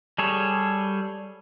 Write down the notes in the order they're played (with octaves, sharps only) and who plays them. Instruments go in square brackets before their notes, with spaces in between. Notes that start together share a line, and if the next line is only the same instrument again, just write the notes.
[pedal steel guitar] G3 G#4 A4 C#5